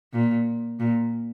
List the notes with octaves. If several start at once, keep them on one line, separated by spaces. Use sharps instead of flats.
A#2
A#2